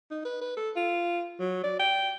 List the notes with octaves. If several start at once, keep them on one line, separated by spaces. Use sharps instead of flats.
D#4
B4
B4
A4
F4
F#3
D5
G5